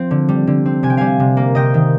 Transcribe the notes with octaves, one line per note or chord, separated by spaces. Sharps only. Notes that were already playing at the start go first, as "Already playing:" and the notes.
Already playing: F3 C4
D3
G3
D3
C4
C3 G#5
G5
G3 F5 G#5
C3
A#3
C3 D#5 G5
D#3